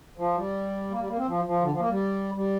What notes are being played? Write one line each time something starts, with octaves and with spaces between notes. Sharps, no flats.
F3
G3
A#3
G3
A#3
C4
F3
F3
D3
F3
A#3
G3
G3